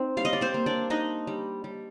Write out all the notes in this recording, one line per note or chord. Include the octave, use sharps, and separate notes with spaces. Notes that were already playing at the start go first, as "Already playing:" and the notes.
Already playing: C4 D#4
G3 F5
D#5
D5
C4 C5
A#3
D4 D5
D4 D#4 D#5
G3
G3